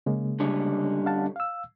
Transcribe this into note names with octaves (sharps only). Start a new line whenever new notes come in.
C#3 G#3 A#3
D3 G3 C#4
F5 F#5 A5
F5 E6